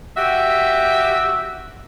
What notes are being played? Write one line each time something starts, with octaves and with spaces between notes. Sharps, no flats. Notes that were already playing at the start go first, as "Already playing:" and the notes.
F#4 G4 E5